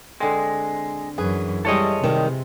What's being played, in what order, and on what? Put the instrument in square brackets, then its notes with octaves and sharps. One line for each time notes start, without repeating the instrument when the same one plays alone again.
[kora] D3 C4 [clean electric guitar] G#3
[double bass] F#2 E3 [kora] G#4 B4
[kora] E3 G#3 [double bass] G3 [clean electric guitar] A4 C#5 D#5
[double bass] C3 [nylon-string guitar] D#3 G3